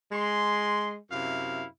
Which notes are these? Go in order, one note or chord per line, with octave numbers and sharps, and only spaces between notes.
G#3 C6
F#2 C3 E4 F5